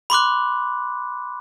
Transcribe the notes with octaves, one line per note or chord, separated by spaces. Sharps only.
B5 C6 D6 F#6